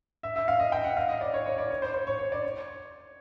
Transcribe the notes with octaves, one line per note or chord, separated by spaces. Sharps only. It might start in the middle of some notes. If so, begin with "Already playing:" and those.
E5
E5
F5
D#5
G5
F#5
F5
D#5
D5
C#5
C#5
D5
C#5
C5
C5
C#5
C#5
D5
C#5